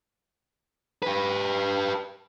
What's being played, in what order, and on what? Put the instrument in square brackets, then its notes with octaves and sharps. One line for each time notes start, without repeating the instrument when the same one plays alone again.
[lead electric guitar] G4 B4